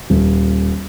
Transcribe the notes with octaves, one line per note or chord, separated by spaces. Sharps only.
D#1